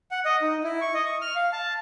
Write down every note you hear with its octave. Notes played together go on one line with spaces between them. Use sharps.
F#5
D#5
D#4
E4
C#6
D#5
C#6
F6
F5
A5